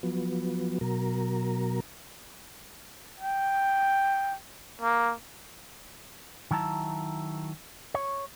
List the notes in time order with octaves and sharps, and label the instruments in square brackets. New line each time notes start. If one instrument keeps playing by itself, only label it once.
[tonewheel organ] F3 F#3 B3
B2 F#3 A#4
[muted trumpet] G5
A#3
[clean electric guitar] D#3 F#3 E4 A5 A#5
C#5